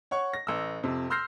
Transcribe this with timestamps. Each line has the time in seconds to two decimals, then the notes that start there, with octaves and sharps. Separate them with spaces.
0.11 C#5 F#5 C#6
0.33 A#6
0.47 A1 E6
0.83 F2 C3
1.10 C6 E6 F6 G6 A#6 C7